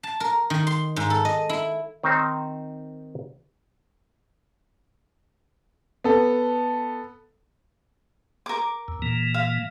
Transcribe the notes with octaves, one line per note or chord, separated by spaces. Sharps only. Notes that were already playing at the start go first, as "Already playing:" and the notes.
A5
A#4
D#3
C6
G#2
A4
D#5
E4
D#3 C4 D#4 C5
B3 A4
A#4 D6
E2
A#2 E3 A#3
F5